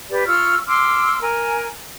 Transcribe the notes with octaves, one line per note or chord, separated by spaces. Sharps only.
G4 B4 D5
F4 C#6 E6 F6
C6 D6 E6 F6
A#4 G#5